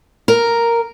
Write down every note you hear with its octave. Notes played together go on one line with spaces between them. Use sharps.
A#4